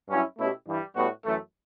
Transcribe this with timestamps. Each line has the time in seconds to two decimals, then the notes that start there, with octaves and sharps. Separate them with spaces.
0.08 G2 F#3 C#4 E4
0.37 B2 A3 C#4 E4 G4
0.66 G2 E3 G3
0.95 A2 G3 B3 F#4
1.25 F#2 E3 A3